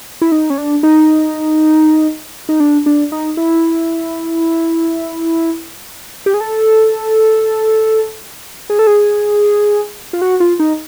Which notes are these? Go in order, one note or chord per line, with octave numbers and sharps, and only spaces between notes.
E4
D#4
C#4
D4
D#4
D#4
D4
D4
D#4
E4
G4
G#4
A4
G#4
A4
G#4
F4
F#4
F4
D#4